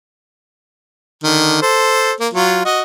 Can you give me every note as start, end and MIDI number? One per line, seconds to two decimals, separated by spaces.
1.23 1.58 50
1.23 1.58 51
1.62 2.13 69
1.62 2.13 72
2.20 2.28 58
2.33 2.61 54
2.33 2.61 65
2.65 2.82 66
2.65 2.82 75